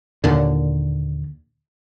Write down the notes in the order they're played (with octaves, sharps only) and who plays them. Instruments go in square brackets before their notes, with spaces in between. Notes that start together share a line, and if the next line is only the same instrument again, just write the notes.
[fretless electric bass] D#2 A#2 D3